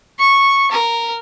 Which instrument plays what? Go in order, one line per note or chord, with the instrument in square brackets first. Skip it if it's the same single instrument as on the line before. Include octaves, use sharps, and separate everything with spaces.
[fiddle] C#6
A#4